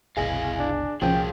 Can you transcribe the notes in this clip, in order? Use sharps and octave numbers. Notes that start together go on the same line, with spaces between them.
F#1 C2 B2 E4 G#4 D#5 F5
D4
C2 A#2 F3 C#4 F#4 G#4 G5